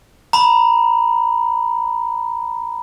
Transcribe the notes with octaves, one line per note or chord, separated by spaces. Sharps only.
A#5 B5